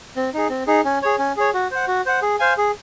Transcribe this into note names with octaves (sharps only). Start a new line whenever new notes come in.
C4
D#4 G#4
C4
D#4 G#4
C#4
G#4 C#5
C#4
G#4 C#5
F#4
C5 F#5
F#4
C5 F#5
G#4
C5 F5 G#5
G#4